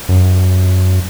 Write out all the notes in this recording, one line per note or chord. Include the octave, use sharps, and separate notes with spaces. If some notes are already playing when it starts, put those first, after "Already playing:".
F#2